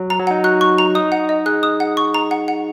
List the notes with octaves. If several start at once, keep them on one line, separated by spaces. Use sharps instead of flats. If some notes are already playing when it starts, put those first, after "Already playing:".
Already playing: F#3
A#5
F#3
D#4 F#5
F#4 F#6
C#6
A#5
D#4 D#6
F#5
D#5
G#4 F#6
D#6
F#5
C#6
A#5
F#5
F#5